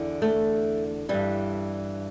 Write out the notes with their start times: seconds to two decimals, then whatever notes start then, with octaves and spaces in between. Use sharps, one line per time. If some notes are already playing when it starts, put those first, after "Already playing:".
Already playing: E2 D3
0.22 A3
1.09 G2 E3 G3